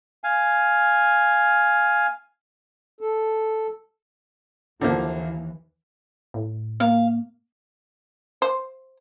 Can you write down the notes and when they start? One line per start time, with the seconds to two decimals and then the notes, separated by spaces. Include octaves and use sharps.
0.24 F5 G#5
3.01 A4
4.81 D#2 D3 E3 F3 A#3
6.34 A2
6.80 A#3 F5
8.42 C5